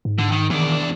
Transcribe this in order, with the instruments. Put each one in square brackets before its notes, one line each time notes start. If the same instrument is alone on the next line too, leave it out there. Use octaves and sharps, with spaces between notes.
[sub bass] G#2
[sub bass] G#2 [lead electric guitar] D3
[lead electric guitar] D#3
[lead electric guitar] E2 D4 [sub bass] D#3